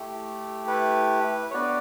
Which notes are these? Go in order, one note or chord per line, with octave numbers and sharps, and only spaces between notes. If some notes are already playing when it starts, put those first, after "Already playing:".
Already playing: A3 E4 G4
B4
C#5
B3 D4 F#4 B4 D5